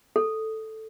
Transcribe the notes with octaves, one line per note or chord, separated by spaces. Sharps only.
A4